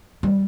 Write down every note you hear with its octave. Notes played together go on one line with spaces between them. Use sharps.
G3